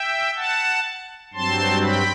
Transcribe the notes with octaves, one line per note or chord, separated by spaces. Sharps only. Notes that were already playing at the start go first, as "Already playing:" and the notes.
Already playing: E5 G5
F#5 A5
G2 F#3 C4 A5 C6
G5 B5